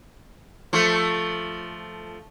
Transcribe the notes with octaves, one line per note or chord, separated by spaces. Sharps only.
F3 A3